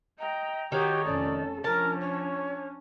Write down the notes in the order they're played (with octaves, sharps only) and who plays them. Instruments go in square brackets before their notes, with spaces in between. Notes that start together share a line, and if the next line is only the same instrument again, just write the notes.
[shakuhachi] D#5 [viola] G5 A#5
[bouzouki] D#3 D#4 [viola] F#4 C#5 [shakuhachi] G4
[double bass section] F1 C#4 [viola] A4 [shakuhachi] D5
[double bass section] F3 [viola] C#4 D4 [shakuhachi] A#4 [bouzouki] A5
[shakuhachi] C#5